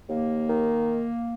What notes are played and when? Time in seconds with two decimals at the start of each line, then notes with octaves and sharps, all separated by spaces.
0.09 D#2 A#3
0.49 D#3